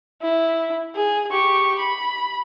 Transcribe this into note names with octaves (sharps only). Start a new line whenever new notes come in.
E4
G#4
G4 C#6
B5